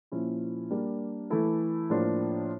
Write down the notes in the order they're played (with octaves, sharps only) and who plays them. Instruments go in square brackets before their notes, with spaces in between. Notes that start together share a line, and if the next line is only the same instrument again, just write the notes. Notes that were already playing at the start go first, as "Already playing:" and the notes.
[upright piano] A#2 F3 C#4 E4
G3 A#3 D4
E3 A3 E4 A4
A2 F3 A#3 D4 F4